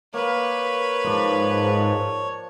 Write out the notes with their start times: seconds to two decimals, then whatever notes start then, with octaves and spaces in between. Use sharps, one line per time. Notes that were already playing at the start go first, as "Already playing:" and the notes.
0.14 A#3 B4 C#5
1.05 G#2 F3 D4